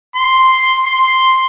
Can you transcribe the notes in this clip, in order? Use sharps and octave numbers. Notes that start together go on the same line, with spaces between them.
C6
C6